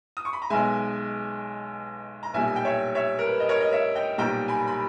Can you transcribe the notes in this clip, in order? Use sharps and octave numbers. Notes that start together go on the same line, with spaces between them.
D#6
C#6
B5
A#5
B1 B2 G#3 E5 G#5
A#5
B1 A#2 G3 E5 G#5
G#5
G5
C#5 E5
C#5 E5
A#4
B4
D#5
A#4 C#5
D#5
C#5 E5
D#5 G5
B1 A#2 G3 G5 A#5
G#5 B5
B5